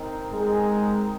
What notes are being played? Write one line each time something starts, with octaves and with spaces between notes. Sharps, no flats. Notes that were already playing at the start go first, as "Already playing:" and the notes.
Already playing: C4 D#4 A#4
G#3